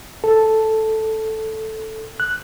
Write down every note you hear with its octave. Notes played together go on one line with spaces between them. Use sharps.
A4
F#6